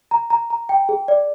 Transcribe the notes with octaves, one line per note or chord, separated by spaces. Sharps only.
A#5
A#5
A#5
G5
G#4
D5